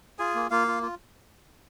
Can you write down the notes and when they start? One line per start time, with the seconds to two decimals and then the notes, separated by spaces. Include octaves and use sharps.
0.19 F4 G#4 G#5
0.35 A#3
0.51 A#3 F4 F5
0.67 F4
0.82 F4